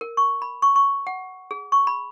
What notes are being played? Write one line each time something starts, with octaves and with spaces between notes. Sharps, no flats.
A#4
C#6
B5
C#6
C#6
F#5
G#4
C#6
B5